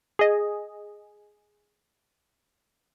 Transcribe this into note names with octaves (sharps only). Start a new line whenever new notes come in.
G#4 D#5